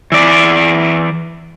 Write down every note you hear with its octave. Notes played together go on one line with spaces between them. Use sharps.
E3 D5